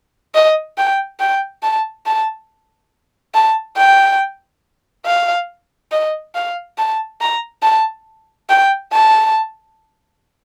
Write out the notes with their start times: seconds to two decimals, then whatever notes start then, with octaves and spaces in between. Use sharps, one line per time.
0.35 D#5
0.77 G5
1.20 G5
1.62 A5
2.06 A5
3.34 A5
3.77 G5
5.06 F5
5.91 D#5
6.35 F5
6.78 A5
7.21 A#5
7.63 A5
8.49 G5
8.92 A5